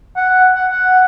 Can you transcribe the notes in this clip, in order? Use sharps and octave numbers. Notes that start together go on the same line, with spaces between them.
F#5
F#5
F#5